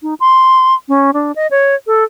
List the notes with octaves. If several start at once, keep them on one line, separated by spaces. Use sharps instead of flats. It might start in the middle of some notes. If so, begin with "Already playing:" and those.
D#4
C6
C#4
D4
D#5
C#5
A4